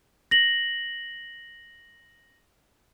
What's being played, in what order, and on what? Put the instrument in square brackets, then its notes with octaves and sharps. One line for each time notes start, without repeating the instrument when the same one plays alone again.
[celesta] A#6 F#7